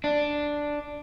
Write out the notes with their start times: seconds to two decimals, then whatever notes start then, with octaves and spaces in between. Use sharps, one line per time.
0.04 D4